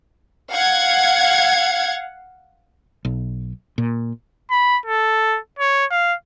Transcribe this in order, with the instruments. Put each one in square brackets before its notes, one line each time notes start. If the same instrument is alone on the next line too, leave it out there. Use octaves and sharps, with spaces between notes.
[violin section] F5 F#5 G#6
[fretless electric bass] B1
A#2
[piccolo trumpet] B5
A4
C#5
F5